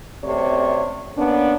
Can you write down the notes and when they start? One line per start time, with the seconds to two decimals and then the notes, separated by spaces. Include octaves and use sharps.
0.24 F#2 C3 A3 C#5 D5
1.17 A#3 B3 C#4 D4